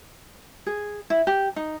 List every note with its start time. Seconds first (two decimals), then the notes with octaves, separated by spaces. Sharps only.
0.66 G#4
1.10 E4
1.27 G4
1.56 D#4